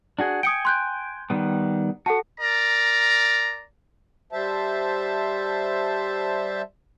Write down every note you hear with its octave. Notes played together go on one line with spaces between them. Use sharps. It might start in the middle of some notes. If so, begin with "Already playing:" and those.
D4 F#4 G#4
G5 G#5 D#6 C#7 D7
C6 F#6 G6
D#3 G3 B3
F#4 A4 F#5 A5
A#4 D5 A#5
G3 C5 E5 A5